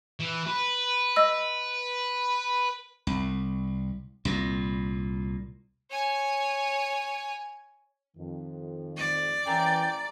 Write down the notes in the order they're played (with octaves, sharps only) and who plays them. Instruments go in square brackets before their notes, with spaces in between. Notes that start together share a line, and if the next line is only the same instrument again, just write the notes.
[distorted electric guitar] E3
B4
[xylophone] D#5 E6
[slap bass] C2
C2 A#2
[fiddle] C#5 G#5
[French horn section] F2 D#3
[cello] D5
[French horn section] E3 C#4 [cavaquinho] G#4 A#4 E5 [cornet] G5